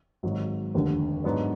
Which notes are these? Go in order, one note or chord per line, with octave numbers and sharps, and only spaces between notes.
G#1 G#2 F#3
F1 D#2 D3
G#2 F#3 B3 D4